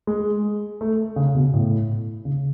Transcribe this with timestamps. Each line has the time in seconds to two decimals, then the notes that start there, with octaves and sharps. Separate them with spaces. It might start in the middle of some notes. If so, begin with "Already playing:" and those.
0.07 G#3
0.81 A3
1.16 C#3
1.35 B2
1.53 A2
2.25 C#3